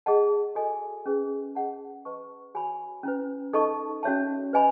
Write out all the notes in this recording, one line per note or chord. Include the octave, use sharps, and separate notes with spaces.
G#4 D#5 F#5 A5
F#4 A4 D#5 G#5
C#4 G#4 B4
G#4 D#5 F#5 A5
B4 D#5 A5 C#6
F#4 C#5 G#5 B5
C#4 E4 B4
D#4 A4 D#5 A5 C#6
C#4 F#4 C#5 E5 A5
B4 D#5 G#5 B5